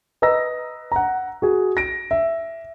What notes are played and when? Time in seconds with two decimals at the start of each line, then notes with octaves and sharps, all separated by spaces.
0.22 B4 D#5 A#5 E6 A#6
0.92 F#5 A#5
1.42 F#4 G#4
1.77 A#6 D7
2.11 E5